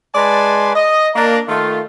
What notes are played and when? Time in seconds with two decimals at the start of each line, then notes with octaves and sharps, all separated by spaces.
0.15 G#3 B4 D5 G#5 A5 C6
0.75 D#5
1.16 A#3 D4 A#5
1.48 D#3 A3 F4